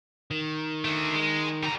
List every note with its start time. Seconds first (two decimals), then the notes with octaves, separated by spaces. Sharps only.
0.31 D#3
0.84 A3 D4
1.14 G#3
1.63 G3 A#5